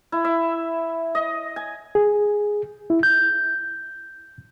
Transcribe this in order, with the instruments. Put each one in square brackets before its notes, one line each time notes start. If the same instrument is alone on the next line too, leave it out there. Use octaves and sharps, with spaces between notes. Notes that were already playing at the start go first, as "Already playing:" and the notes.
[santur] E4
E5
D#5
G#5
[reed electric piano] G#4
E4
G6